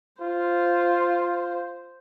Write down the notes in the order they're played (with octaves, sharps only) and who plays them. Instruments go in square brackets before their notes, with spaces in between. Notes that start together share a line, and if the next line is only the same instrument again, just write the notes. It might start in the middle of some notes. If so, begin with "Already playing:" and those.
[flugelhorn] F4 [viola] C5